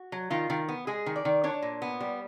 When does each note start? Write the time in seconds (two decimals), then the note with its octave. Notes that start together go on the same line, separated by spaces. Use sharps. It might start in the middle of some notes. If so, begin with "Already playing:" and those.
Already playing: F#4
0.12 F#3
0.30 D#3 F4
0.50 D#3
0.69 B3
0.87 G#3 G#4
1.06 D#3
1.16 D5
1.25 D#3
1.44 D4 C#5
1.62 A#2
1.82 B3
2.00 G3